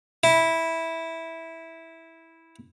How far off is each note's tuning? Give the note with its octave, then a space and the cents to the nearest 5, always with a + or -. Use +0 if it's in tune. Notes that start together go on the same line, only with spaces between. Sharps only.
E4 -10